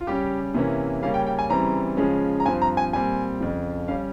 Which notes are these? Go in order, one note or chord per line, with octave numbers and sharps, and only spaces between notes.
F4
C#3 G3 C#4 G4
C3 E3 A#3 C#4
C#3 G3 A#3 C#4 F5
G5
G5
G#5
C#3 E3 G3 C4 A#5
C#3 F3 G#3 C#4
A#5
G2 F3 C4 G#5
A#5
G#5
A#2 G3 C4 G#5
F2 C#3 F3
G3 C#4 F5